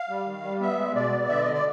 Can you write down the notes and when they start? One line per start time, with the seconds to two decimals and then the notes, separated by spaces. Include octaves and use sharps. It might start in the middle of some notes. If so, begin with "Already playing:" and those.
Already playing: F5
0.09 G3
0.26 D#3
0.43 G3
0.61 B3 E5
0.77 G#3
0.95 B2 D5
1.13 B3
1.29 D3 E5
1.40 D#5
1.47 D3
1.53 D5